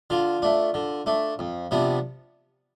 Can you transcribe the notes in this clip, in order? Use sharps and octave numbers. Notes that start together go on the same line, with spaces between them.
D3 F4
A3 D4
D3
A3 D4
F2
C3 F3 B3 D4